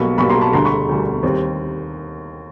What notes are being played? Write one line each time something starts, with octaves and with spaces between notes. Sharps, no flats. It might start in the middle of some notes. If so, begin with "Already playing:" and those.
Already playing: B1 B2 G3 A#3 B5 C#6
B1 B2 G3 A#3 B5 C#6
A#5 C6
A5 B5
E1 D2 D3 G3 A#5 C6
B5 C#6
E1 D2 D3 G3
D#2 D#3 G3 C4